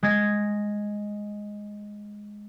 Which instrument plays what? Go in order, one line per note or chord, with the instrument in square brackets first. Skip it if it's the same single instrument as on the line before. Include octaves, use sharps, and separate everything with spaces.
[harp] G#3 G#6 A#6